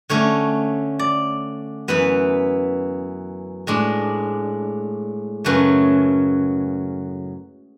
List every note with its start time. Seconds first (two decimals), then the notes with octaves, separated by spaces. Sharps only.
0.09 D3 A3 C#4 C#5
0.99 D5
1.88 F#2 E3 B3 B4
3.67 A2 G#3 D4
5.45 F#2 C#3 F#3 A3 B4